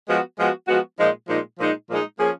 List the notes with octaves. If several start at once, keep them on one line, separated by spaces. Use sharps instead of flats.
F3 G#3 B3 F#4
F3 G#3 B3 F#4
F3 G#3 B3 F#4
A#2 F3 G#3 D#4
A#2 F3 G#3 D#4
A#2 F3 G#3 D#4
A#2 F3 G#3 D#4
F3 A#3 C#4 G#4